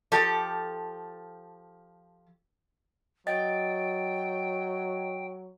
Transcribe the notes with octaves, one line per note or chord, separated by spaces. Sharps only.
F3 G4 A4
F#3 D#5 G5 A6